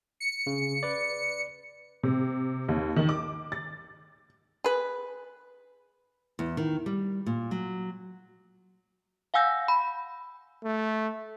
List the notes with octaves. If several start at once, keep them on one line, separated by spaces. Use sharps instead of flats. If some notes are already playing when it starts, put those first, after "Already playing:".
C#7
C#3
B4 D5
C3
D#2
D#3
D6
A6
G#4 B4
E2
D#3
G3
A#2
F#3
F5 F#5 G#5 E6 G6 A#6
B5
A3